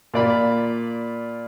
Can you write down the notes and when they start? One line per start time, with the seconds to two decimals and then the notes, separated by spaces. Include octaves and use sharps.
0.14 A#2 D5 B5